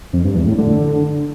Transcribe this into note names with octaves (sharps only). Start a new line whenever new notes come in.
F2
G2
E2
A2
D3